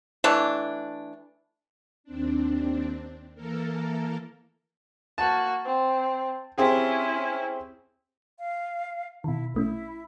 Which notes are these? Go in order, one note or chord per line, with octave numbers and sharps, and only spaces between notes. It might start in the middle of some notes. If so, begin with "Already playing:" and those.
E3 A3 D4
D#2 C4 D4
E3 A#3 A4 A#4
A#3 F#4 A5
C4
C4 C#4 E4 G4 G#4
F5
B2 D#3 E4
A#1 A3 C#4 E4